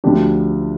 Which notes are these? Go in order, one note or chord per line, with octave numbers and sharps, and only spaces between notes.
D2 D3 F3 D4 G4